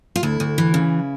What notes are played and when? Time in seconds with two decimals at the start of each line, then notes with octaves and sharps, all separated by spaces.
0.16 F4
0.23 D2 E4
0.40 D2
0.58 E3
0.74 C#3